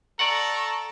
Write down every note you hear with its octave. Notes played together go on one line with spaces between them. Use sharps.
A4 D5 F#5 A#5 C#6